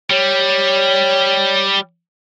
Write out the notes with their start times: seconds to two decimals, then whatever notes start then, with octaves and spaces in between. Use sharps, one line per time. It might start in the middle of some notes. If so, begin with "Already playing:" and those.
0.10 G3 C#5